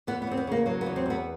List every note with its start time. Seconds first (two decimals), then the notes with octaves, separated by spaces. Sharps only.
0.07 E2 B3
0.22 B3
0.27 E2 C4
0.37 B3
0.47 C#3 A#3
0.66 F#3 A#3
0.81 B3
0.86 E2
0.96 C4
1.06 E2 B3